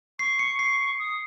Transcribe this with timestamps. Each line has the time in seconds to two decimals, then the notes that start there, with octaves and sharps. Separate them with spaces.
0.19 C#6 C7
0.39 C#7
0.59 C7
0.99 D#6